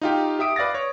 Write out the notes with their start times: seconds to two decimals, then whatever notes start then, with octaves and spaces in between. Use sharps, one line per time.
0.01 D#4 F4 G4
0.39 G4 E5 D#6 D7
0.56 B4 D5 F5 A6 A#6
0.74 C#5